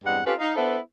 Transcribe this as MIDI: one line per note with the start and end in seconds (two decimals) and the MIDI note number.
0.05 0.21 40
0.05 0.21 43
0.05 0.21 55
0.05 0.21 56
0.05 0.21 60
0.05 0.21 78
0.26 0.34 60
0.26 0.34 61
0.26 0.34 65
0.26 0.34 67
0.26 0.34 69
0.26 0.34 71
0.39 0.56 63
0.39 0.56 77
0.56 0.77 59
0.56 0.77 62
0.56 0.77 64
0.56 0.77 69
0.56 0.77 71
0.56 0.77 72